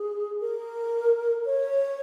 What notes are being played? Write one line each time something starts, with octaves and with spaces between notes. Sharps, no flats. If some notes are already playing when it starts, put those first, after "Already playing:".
Already playing: G#4
A#4
C#5